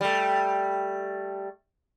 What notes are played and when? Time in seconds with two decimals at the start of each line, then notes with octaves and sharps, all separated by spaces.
0.01 G3 A3